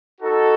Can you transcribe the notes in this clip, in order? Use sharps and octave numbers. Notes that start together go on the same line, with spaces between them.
D#4 F#4 A4